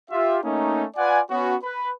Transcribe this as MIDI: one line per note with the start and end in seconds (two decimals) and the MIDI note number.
0.10 0.37 65
0.10 0.37 67
0.10 0.37 76
0.42 0.83 57
0.42 0.83 58
0.42 0.83 61
0.42 0.83 63
0.96 1.20 65
0.96 1.20 71
0.96 1.20 74
0.96 1.20 78
0.96 1.20 80
1.30 1.55 59
1.30 1.55 61
1.30 1.55 66
1.63 1.90 71